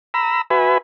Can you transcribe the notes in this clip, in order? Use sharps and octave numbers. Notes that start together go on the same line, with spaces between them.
A#5 B5 E6
F#4 B4 E5 G#5 B5